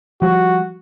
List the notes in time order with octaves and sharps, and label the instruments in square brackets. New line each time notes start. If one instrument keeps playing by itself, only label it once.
[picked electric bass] F3 G3 [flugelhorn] F#4